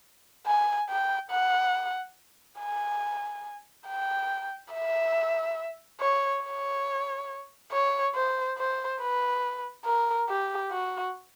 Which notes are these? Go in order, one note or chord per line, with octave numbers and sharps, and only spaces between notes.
G#5
G5
F#5
G#5
G5
E5
C#5
C#5
C#5
C5
C5
B4
A#4
G4
F#4